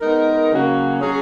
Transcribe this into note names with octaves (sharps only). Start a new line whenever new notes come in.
G#3 B3 D#4 A#4
C#3 F#3 A#3 C#4 F#4
F#3 C#4 G#4